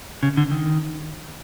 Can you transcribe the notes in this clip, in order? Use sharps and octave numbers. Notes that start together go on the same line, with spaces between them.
C#3
D3
D#3